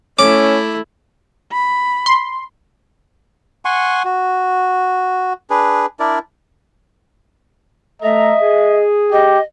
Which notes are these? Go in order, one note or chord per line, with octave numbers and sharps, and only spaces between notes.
A3 C#4 E4 D6
B5
C6
F#5 G#5 C6 C#6
F#4
D4 G#4 B4
D4 E4 A#4 D5
A3 A4 D#5 E5 A#5
G#4
G4 D#5